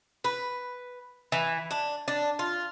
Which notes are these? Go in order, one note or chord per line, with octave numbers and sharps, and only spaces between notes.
B4
E3
D4
D4
F4